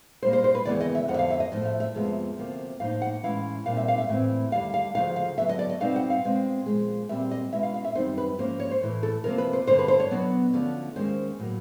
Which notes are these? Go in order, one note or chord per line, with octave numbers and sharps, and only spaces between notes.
A#2 G3 A#3 C5
C5
C5
B4
D#2 C#3 E3 G#3 B3 D5
D#5
E5
F2 D3 F3 F#5
E5
F5
E5
D#5
A2 F3 A3 D#5
E5
E5
F2 C3 F3 G#3 B3
D2 C3 F3 A#3
A2 F3 A#3 D#4 F5
F#5
A2 E3 G#3 C#4 E4 F5
A#2 G3 C4 D#4 F5
E5
F5
E5
A2 E3 A3 C4
D#2 D3 G3 F5
F5
D2 C#3 F3 F5
F5
D3 F#3 B3 E5
D#5
D5
D#5
B2 G3 C4 D#4 F5
F#5
F5
B2 G#3 C4
A#2 F3 G#3
A#2 G3 C4 E5
D#5
B2 G#3 C#4 E4 E5
F5
F5
E5
F#2 D#3 G3 C4 D#4 C5
B4
G#2 F3 A#3 C#4 C5
C#5
C5
A2 E3 A3
A4
C3 F3 A#3 A#4
B4
C5
G2 D3 G3 C5
B4
C5
C#5
B2 F#3 B3 D4
D2 D3 F3 A3 C#4
D#2 D#3 G#3 C#4 C5
A2 F#3 A#3